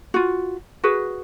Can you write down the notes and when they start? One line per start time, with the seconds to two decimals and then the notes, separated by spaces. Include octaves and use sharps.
0.14 F4 F#4
0.84 F#4 G#4 B4